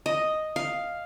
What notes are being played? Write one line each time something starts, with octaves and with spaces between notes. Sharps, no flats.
D#5
F5